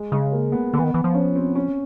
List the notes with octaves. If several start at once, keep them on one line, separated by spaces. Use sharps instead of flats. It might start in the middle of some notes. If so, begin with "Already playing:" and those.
Already playing: G#3
C#3 G#3
A#3
B3
D3 B3
E3
D#3
E3
F3
C#4
C4
C#4